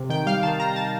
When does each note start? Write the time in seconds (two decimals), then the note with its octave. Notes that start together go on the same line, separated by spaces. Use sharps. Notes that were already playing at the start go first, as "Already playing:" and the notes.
Already playing: C3
0.10 D#3 G5
0.26 G3 F5
0.43 D#3 A5
0.59 D#3 A#5
0.76 A5